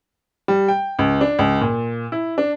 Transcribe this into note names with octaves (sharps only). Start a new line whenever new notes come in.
G3
G5
C#2
D4
C#2
A#2
E4
D4